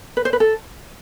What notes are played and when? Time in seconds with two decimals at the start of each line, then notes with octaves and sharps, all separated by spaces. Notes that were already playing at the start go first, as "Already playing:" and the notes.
0.17 B4
0.25 C5
0.33 B4
0.40 A4